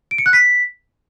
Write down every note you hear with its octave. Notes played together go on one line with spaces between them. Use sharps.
D7
C#7
F#6
B6